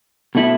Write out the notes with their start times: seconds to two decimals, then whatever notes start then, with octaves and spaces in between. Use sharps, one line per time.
0.35 B2 A3 E4